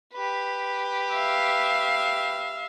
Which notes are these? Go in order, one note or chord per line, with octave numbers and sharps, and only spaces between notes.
G4 B4
E5 F5